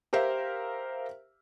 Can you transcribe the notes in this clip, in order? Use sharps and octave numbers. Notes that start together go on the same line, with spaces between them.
G4 A#4 C5 E5 F5